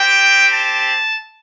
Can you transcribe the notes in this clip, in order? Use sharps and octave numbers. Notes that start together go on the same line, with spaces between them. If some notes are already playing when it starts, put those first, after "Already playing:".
Already playing: C4 G4 G5
A5